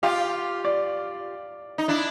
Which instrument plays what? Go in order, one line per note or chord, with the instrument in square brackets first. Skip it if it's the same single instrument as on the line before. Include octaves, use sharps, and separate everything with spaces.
[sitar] F4 G4 [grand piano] F5
[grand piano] D5
[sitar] D#4
D4 E4